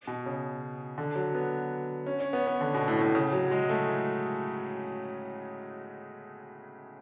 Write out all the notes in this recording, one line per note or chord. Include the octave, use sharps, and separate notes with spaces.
B2
C#3
D3
F#3
B3
C#4
C#4
B3
B3
D3
B2
A2
A2
C#3
F#3
G#3
A3